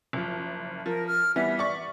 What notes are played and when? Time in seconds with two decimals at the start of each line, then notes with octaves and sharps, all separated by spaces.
0.13 F#1 F3
0.86 F3 A#4
1.07 F6
1.36 E3 G3 B3 E5
1.59 D5 C#6